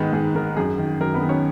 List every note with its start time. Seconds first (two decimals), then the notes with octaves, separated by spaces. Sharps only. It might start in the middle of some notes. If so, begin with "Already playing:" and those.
Already playing: G#2 D#3 B3 G#4 B4
0.13 G#2 G#4
0.35 D#3 A#4
0.57 F#2 G#4
0.78 D#3
1.01 F#2 A#4
1.14 B3 B4
1.22 D#3
1.29 C#4 C#5